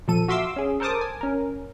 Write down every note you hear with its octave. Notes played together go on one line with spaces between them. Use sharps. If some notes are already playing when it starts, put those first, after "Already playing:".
A#2 F3 A4 D#7
F#4 E5 F5 C6 D6 E6
C#4 G#4
A4 A#4 C5 A5 D6 D#6
G#5
C#4 A#4